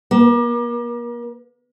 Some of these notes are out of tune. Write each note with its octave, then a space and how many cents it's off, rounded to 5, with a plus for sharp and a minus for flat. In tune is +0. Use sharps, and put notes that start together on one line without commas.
A#3 +40